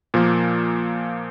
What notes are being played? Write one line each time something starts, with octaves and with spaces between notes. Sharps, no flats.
A#2 F3 A#3